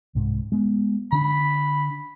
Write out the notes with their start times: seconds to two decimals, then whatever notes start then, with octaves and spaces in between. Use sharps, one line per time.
0.15 C2 G#2
0.52 G#3 B3
1.12 D3 D4 B5